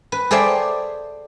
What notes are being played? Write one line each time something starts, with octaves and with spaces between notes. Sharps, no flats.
B4
G#4 A4 C5 D5 E5 G5